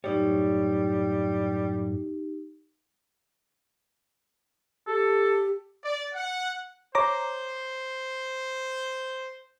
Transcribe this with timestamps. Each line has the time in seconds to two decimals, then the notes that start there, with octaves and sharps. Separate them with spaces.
0.04 F#2 A2 G3 D#4 G4 C#5
4.87 G4 A4
5.84 D5
6.15 F#5
6.95 C5 C#5 A#5 D6